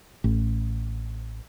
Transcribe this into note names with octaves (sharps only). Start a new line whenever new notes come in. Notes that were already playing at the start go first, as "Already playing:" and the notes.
A1